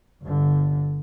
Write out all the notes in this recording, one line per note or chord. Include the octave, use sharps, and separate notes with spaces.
G1 D3